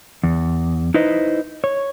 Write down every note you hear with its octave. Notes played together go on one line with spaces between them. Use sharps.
E2
D#4 E4 B4 C5 D#5
C#5